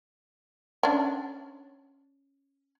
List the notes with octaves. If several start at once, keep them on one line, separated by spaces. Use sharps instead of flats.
C#4 D4